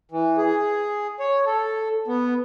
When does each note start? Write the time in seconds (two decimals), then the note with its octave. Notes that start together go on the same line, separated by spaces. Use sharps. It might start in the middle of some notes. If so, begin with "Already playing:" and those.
0.12 E3
0.38 G#4
1.20 C#5
1.46 A4
2.08 B3